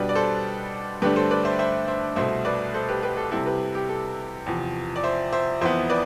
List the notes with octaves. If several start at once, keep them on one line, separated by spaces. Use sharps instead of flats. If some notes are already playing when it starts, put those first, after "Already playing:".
Already playing: B2 G3 D4 G4 B4
D5
A4 C5
G2 D3 A3 D4 G4 B4
A4 C5
B4 D5
C5 E5
C5 E5
C5 E5
C2 B2 A3 C5 E5
B4 D5
A4 C5
G4 B4
G4 B4
A4
C3 G3 C4 E4 A4
G4 B4
G4
A4
E2 C3 F3
D5
C5 E5
C5 E5
F2 E3 B3 C5 E5
B4 D5